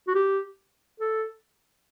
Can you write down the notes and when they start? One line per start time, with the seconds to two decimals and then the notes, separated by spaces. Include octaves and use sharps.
0.08 F#4
0.15 G4
1.00 A4